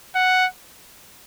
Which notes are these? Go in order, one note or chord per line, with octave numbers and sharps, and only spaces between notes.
F#5